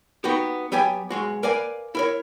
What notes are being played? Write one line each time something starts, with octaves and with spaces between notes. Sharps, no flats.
B3 D#4 F#4 G4
F#3 B3 G4 G5 G#5
B1 G#3 F#4
A#4 B4 D5 F5 G#5
E4 A#4 C#5